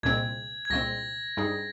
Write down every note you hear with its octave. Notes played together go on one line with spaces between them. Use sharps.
C2 A#2 G#3 C4 G#6
G#6
C2 A#2 G#3 C4 A#6
G2 G3 C4 D#4 G#4